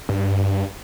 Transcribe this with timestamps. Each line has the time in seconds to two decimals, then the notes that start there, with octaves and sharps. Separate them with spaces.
0.09 G2